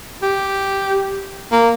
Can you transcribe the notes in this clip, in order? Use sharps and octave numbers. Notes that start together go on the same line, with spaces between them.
G4
A#3